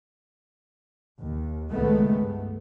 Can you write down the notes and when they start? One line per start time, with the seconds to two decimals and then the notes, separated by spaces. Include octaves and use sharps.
1.20 D#2
1.71 C#2 A2 D#3 G#3 A3 B3
2.19 G2